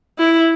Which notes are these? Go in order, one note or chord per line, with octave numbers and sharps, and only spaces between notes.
E4